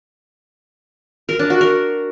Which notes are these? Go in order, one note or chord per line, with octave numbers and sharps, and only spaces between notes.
A#4
D4
F#4
A#4